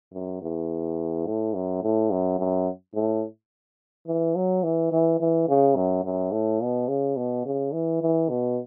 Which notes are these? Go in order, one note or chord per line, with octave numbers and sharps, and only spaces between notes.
F#2
E2
A2
F#2
A2
F#2
F#2
A2
E3
F#3
E3
E3
E3
C#3
F#2
F#2
A2
B2
C#3
B2
C#3
E3
E3
B2